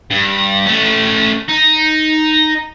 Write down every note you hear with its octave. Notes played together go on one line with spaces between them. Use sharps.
G2
A3 C#4
D#4